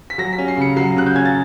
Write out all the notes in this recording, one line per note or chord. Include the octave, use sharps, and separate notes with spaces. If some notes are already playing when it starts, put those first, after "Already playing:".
B6
F#3 A#6
B6
C#4
C7
C#3 C#7
F#3 C7
C#3 F#6
G6
C#4 G#6
A6